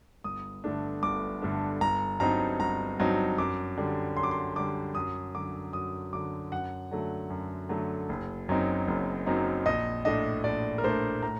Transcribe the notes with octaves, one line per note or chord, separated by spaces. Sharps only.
G1 D#6
G2 D3 A3 D4
G1 D6
G2 D3 A3 D4
G1 A#5
G2 F#3 C4 D#4 A#5
G1 A#5
G2 F#3 C4 D#4
F#2 D6
D3 G3
F#2 C6
D6
C6
D3 G3 D6
F#2 D#6
D3 F#3 D6
F#2 D#6
D3 F#3 D6
F#2 F#5
D3 F#3 A3
F#2
D3 F#3 A3
F#1
F#2 F#3 C4 D#4
F#1
F#2 F#3 C4 D#4
A#1 D#5
A2 A3 D4 D#5
A#1 D5
A#4
A2 A3 D4 C5
A2 A#5